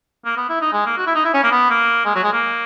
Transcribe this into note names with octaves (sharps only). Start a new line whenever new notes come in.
A#3
B3
E4
D#4
G#3
A#3
F#4
E4
D#4
E4
C#4
A#3
B3
A#3
G#3
F#3
G#3
A#3